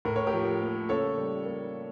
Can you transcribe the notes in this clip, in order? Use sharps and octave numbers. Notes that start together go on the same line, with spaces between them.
A2 A#4
C#5
G4 A#4
F3
A#3
C#3 A4 C#5
G3
A#3